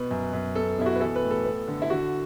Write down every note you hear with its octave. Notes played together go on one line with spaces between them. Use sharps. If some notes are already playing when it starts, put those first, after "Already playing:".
Already playing: B2 B4
F#2
F#2
B3 A4
B2 E4
F#4
B4
E3 A4
B4
A2
A4
B3
D3
E4
D3 F#4